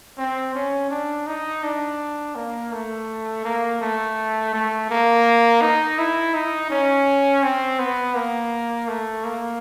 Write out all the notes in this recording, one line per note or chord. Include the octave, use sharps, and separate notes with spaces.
C4
C#4
D4
D#4
D4
A#3
A3
A#3
A3
A3
A#3
D#4
E4
D#4
C#4
C4
B3
A#3
A3
A#3